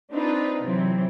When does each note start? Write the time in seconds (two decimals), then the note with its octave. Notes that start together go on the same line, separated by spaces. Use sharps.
0.12 C4 D4 D#4 F4 B4
0.60 C3 E3 F#3 C4